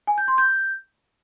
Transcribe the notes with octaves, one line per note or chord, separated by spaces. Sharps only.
G#5
G6
C6
G6